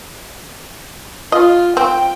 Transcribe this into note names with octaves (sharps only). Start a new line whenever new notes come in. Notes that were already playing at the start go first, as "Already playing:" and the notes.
F4 D#5
C4 G5